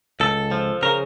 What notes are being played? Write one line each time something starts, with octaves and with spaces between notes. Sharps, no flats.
C#2 A4
F3
C#3 A#4